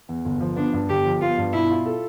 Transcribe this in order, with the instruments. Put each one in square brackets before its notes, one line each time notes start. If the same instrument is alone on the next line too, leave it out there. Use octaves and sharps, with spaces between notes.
[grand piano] E2
G1
F3
[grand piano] B3 [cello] D4
[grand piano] G2
[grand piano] G1 [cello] G4
[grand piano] F3
[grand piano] B3 [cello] F4
[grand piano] G2
[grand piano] B2 [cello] E4
[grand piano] F4
A4